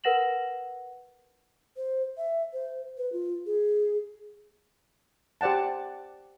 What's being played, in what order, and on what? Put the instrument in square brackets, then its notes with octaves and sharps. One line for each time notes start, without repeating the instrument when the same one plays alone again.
[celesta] A#4 B4 F#5 A#6 E7 F#7
[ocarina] C5
E5
C5
B4
F4
G#4
[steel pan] G4 C5 D5 F#5 A5